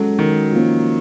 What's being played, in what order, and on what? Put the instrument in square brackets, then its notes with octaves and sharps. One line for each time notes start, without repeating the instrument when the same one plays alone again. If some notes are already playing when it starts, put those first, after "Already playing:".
Already playing: [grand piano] F#3 [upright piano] G#3 C#4 F#4 A4
[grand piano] D#3
[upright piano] F3 A#3 C#4